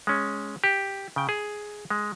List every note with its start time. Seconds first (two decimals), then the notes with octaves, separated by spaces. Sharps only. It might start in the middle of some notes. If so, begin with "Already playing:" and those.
0.07 G#3 C#4
0.64 G4
1.16 C#3 G5
1.29 G#4
1.90 G#3